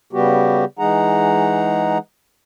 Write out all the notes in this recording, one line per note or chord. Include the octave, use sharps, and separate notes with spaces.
C#3 G3 B3 F#4 G4
E3 G#3 D#4 G#4 F#5 A#5